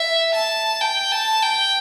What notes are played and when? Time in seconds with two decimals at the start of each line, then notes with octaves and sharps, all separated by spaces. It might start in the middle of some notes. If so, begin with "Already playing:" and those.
Already playing: E5
0.34 A5
0.81 G5
1.12 A5
1.43 G5